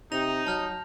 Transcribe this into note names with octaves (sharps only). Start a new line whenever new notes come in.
C3 D#4 A#6 F7
F#3 A5 F6 G6